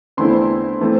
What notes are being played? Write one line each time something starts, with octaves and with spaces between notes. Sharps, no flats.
E2 D3 A3 C4 E4 C6
E3 A3 C4